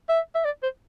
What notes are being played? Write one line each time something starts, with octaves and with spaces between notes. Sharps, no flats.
E5
E5
D5
C5